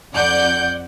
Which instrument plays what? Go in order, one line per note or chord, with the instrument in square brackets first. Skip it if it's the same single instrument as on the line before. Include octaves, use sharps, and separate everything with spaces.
[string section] F2 D5 F#5 G6